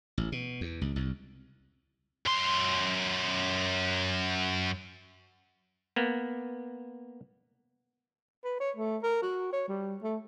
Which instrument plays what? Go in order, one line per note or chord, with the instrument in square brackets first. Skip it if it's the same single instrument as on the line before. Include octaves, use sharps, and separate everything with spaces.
[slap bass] A1
B2
E2
C#2
C2
[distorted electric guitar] F#2 C6
[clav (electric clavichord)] A#3 B3
[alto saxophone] B4
C#5
A3
A#4
F#4
C#5
G3
A3